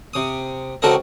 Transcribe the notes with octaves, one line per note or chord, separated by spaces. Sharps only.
C3 D#6
C#2 C4 F#4 A4 A#4 D#5